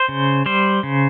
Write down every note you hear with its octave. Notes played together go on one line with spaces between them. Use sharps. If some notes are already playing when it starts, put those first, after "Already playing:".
Already playing: C5
C#3
G3 C5
C#3